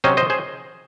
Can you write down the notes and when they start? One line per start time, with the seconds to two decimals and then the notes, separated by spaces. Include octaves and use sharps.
0.04 C3 F#3 C#4 C5 D#5
0.17 C5 D#5
0.30 G#4 C5